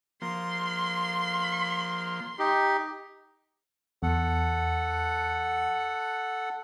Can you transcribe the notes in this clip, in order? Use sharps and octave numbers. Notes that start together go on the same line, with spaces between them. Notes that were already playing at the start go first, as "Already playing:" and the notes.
F3 A#3 C6
D#4 G4
E2 A4 F#5